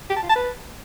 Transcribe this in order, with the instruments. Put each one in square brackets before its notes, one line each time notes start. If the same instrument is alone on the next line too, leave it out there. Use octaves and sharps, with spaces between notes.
[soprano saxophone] G4
A5
F4
A5
B4